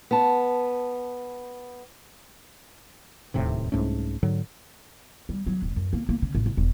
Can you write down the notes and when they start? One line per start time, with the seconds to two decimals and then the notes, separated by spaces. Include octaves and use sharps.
0.11 B3 A5
3.34 D1 D#2 A2 C3
3.72 C2 G#2 A3 C#4
4.23 G#2 D3 F#3
5.29 G3
5.47 F#3
5.62 D#1
5.76 F#2
5.93 A#3
6.09 A#3
6.22 C#3
6.35 A1
6.46 F1
6.57 E1